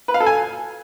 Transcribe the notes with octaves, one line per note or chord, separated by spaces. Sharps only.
B4
F5
A4
G#5